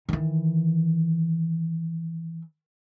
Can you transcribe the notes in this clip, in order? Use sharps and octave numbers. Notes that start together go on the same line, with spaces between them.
D#3 E3